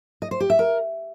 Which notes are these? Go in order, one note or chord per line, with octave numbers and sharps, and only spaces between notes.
D#5
C5
G4
E5
A#4